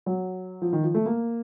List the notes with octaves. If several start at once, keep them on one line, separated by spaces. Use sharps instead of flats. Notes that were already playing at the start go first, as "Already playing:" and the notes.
F#3
F3
D#3
F3
A3
A#3